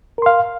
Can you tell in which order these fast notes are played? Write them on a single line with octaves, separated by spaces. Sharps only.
A#4 C6 F5